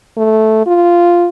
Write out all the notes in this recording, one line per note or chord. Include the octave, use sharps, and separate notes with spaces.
A3
F4